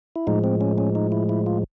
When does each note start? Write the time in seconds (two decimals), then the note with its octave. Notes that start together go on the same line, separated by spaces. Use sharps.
0.16 E4
0.27 A2 F3 G#3 D#4
0.44 C4
0.61 C#4
0.78 C#4
0.95 D#4
1.12 E4
1.29 E4
1.46 F4